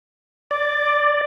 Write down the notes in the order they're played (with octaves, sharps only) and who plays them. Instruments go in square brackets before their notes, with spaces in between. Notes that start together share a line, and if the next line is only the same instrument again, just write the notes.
[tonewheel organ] D5 [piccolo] D6